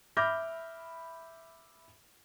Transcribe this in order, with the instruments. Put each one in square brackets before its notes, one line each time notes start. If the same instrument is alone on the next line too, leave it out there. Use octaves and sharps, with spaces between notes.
[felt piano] E5 B5 D6 F6 G6 A#6